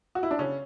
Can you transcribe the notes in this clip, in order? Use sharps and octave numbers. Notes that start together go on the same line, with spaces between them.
F#4
E4
D4
C#3 C#4